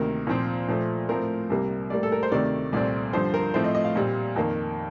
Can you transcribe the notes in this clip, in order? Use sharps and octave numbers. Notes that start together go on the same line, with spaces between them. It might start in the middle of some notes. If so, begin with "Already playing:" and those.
Already playing: D2 C3 D#3 A#3 A#4
A#2 F3 C4
A#2 F3 A3
A2 F3 C4 A#4
C2 C3 G3 A#3
A2 G3 A#3 D5
A4
A#4
C5
D2 C3 D#3 A3 D5
C2 A#2 A3 C4 D5
G2 D3 F3 C5
A#4
A2 F3 A3 C4 C5
D#5
D#5
F5
A#2 G3 C4
F2 D#3 A#3